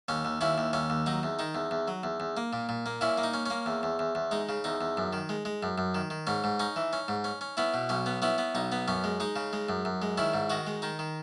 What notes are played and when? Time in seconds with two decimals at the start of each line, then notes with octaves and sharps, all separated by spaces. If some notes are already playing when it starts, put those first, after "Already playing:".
0.08 D#2 C#4
0.25 D#2
0.41 D#2 C#4 E4
0.58 D#2
0.73 D#2 C#4
0.90 D#2
1.06 F#3 D#4
1.23 E2
1.39 D#3 D#4
1.55 E2
1.71 E2
1.88 F#3
2.03 E2
2.20 E2
2.37 A#3
2.53 A#2
2.69 A#2
2.86 A#3
3.01 A#2 C#4 E4
3.18 A#3
3.23 D#4
3.34 C#4
3.46 A#3 C#4
3.66 E2
3.83 E2
3.99 E2
4.15 E2
4.31 G#3 D#4
4.49 C#3
4.64 E2 D#4
4.81 E2
4.97 F#2
5.13 D#3
5.29 G#3
5.45 G#3
5.63 F#2
5.78 F#2
5.95 D#3
6.10 D#3
6.27 G#2 C#4
6.44 G#2
6.59 C#4 D#4
6.76 E3
6.93 C#4
7.08 G#2
7.24 C#4
7.41 C#4
7.57 B3 C#4 E4
7.74 B2
7.89 B1 C#4
8.06 B3
8.22 B3 C#4 E4
8.38 B3
8.55 B1 D#4
8.72 B3
8.88 F#2 C#4
9.04 G#3
9.20 G#3 D#4
9.36 C#3
9.53 G#3
9.69 F#2
9.85 F#2
10.02 G#3
10.18 D#3 C#4 E4
10.34 G#2
10.50 D#3 D#4 F#4
10.67 G#3
10.82 D#3 D#4
10.99 D#3